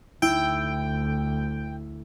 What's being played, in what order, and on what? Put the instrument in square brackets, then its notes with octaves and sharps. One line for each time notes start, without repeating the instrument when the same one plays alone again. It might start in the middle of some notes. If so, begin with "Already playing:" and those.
[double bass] D2 [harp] E4 [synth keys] G5